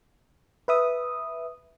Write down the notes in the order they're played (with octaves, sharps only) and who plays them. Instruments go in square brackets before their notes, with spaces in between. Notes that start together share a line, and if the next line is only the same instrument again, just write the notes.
[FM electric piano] B4 E5 D#6